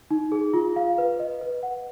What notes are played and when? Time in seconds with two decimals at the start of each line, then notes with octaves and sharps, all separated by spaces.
0.11 D#4
0.32 G#4
0.53 F4
0.76 F5
0.98 B4
1.19 D#5
1.41 B4
1.63 F#5